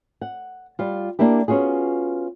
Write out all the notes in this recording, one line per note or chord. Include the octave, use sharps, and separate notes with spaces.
F#5
G3 F4
A#3 D4 E4 G4
B3 C#4 F4 F#4 G#4